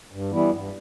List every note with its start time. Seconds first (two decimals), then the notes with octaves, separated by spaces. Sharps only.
0.12 G2
0.31 E3 G3 B3 E4
0.50 G2